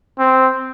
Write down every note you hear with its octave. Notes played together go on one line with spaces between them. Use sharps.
C4